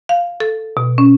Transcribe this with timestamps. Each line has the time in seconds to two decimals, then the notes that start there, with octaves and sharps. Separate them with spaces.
0.09 F5
0.40 A4
0.77 B2
0.98 C#4